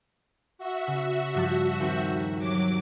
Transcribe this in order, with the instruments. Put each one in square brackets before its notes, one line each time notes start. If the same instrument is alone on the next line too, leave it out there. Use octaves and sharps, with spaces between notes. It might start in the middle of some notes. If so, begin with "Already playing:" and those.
[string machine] F#4 E5
[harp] C#3
G2 F3 A5
D#2 C4
[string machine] F#3 D6